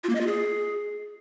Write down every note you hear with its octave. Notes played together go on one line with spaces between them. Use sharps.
F4
A#3
D#5
F4
G#4